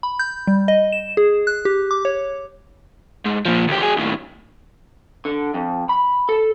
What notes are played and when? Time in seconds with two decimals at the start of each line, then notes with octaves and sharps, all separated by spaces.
0.03 B5
0.19 G6
0.47 G3
0.68 D#5
0.92 E7
1.17 G#4
1.47 F#6
1.65 G4
1.91 D6
2.05 C#5
3.25 G#2
3.45 A#2 F3
3.68 D2 G4
3.81 F#3 G#4
3.97 D#2 A2
5.25 D3
5.54 F2
5.89 B5
6.29 A4